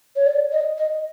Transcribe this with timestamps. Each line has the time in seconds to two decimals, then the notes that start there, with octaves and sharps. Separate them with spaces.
0.16 C#5
0.26 D5
0.52 D#5
0.78 D#5